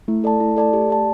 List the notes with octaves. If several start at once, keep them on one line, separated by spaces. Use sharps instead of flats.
A3 E4
A4 D5 A5
E4
A4 D5 A5
G4
D5 A5